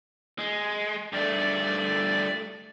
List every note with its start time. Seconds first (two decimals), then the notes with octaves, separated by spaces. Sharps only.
0.39 G#3
1.13 G2 A3 D5